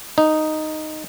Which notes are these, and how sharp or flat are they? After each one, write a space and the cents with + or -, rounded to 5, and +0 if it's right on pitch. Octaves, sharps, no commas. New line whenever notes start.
D#4 -5